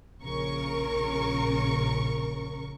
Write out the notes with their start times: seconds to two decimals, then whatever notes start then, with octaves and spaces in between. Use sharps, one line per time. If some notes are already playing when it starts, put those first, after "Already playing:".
0.23 A#1 C#3 A#4 C#6